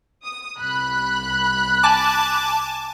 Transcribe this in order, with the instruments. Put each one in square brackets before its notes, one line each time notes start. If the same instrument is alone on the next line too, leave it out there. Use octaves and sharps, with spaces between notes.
[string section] D#6
C2 B5 F#6
[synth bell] G#5 A5 D6